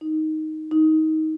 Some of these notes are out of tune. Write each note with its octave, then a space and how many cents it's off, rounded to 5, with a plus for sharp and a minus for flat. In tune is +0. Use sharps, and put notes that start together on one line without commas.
D#4 +5
D#4 +20